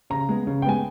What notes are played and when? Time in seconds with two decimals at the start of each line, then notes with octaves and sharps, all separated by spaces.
0.10 C#3 A#5
0.29 G#3 B3
0.47 C#3
0.62 G5
0.65 G#3 B3 G#5